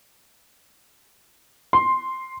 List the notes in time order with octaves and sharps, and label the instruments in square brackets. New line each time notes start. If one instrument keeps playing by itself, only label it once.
[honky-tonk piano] C6